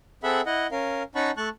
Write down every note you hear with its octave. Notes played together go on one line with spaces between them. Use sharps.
C4 G#4 A4 E5 F#5 B5
E4 D#5 F#5
C#4 A#4 F5
C#4 D#4 F#5 A5 B5 C#6
A3 A5 C#6 F#6